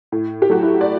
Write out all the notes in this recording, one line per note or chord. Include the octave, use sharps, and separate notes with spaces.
A2
G4
F#3 A3 F#4
E4
D5